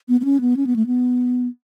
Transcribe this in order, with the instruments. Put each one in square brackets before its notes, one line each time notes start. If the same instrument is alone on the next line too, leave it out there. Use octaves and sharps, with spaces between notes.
[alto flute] B3
B3
C#4
B3
C#4
B3
A3
B3